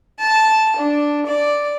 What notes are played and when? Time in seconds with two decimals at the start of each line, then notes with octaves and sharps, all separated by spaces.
0.20 A5
0.76 D4
1.26 D5